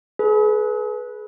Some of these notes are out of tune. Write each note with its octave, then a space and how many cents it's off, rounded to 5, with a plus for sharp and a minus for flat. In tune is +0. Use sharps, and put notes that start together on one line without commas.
G#4 +40 B4 -10